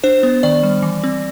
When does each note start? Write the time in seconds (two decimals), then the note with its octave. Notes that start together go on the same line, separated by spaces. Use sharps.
0.04 D4 C5
0.23 B3
0.43 D#3 D5
0.63 G3
0.82 E3
1.04 C4